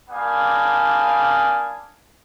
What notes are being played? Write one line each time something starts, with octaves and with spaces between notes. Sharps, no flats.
G3 A#3 D4 F5 G#5 D#6